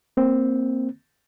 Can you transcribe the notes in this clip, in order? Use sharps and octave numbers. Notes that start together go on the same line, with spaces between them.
A#3 C4